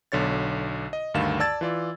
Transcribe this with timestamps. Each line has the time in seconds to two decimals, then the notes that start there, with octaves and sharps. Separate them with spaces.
0.12 B1 D3 C#5 A6
0.93 D#5
1.14 D2 G2 D#3 F5 E7
1.40 D5 A5 E6 G#6 A6
1.61 E3 F4 D5